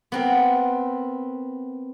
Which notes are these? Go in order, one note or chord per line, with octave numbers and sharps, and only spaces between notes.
B3 C4 A#4